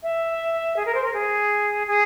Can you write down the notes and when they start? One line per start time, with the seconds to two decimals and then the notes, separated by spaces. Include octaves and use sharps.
0.03 E5
0.76 G#4
0.86 A#4
0.95 C5
1.04 A#4
1.14 G#4
1.87 G#4